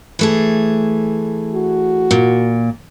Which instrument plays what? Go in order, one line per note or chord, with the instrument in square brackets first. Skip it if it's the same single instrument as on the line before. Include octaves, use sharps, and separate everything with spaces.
[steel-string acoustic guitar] E3 A3 G#4
[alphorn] F#4
[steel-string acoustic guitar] A#2